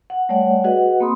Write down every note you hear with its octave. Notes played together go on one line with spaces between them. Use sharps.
F#5
G3 A3 C#5 D5 F#5
F#4 G#4 B4 D#5 F#5
A#3 C4 B5 C6 D#6